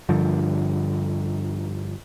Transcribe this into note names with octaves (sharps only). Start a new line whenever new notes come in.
G2 D3 F3